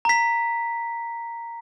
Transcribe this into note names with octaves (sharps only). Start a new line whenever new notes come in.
A#5 B6